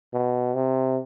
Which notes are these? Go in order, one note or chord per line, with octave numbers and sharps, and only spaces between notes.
B2
C3